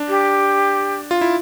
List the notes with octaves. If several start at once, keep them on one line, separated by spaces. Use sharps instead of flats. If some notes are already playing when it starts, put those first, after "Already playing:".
Already playing: D4
G4
F4
E4